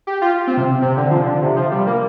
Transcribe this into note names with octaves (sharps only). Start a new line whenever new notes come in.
G4
F4
C4
C3
C3
D3
F3
D3
C3
F3
G3
A#3